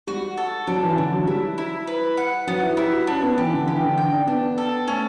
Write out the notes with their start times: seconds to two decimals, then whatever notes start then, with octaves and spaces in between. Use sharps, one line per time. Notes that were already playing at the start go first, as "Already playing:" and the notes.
0.07 G3 F#4
0.37 A4
0.67 F#3 D4
0.83 E3
0.97 D3 D4
1.13 F#3
1.27 G3 E4
1.58 E4
1.87 B4
2.17 F#5
2.47 F#3 B3
2.63 E4
2.77 E4 G4
2.93 F#4
3.07 C#4 D4
3.23 B3
3.38 E3 G4
3.53 D3
3.67 E3 G4
3.83 D3
3.98 G5
4.12 D4
4.27 B3 D4
4.58 A4
4.88 A3 C#4